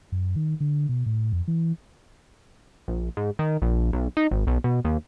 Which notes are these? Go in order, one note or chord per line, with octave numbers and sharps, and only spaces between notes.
F#2
D#3
D3
B2
A2
F2
E3
A#1
G#2
D#3
A#1
B1
D#4
G#1
B1
B2
D#2